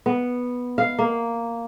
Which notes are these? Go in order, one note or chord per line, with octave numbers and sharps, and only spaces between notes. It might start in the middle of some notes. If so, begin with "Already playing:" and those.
B3
F5
A#3